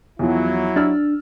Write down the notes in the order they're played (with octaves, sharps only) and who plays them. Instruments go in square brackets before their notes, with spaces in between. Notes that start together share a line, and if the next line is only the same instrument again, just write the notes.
[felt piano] E2 F3 [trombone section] F#3 E4
[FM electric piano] D4 [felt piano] E6 F6 A6